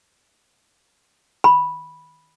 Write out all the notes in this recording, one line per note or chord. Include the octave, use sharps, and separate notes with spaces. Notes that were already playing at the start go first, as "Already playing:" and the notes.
B5